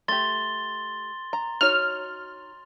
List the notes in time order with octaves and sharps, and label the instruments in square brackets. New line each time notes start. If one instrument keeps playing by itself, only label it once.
[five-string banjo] A3 G4 [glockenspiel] C6 A6 G7
[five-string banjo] A#5
[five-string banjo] D#4 F#4 C#5 [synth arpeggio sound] F6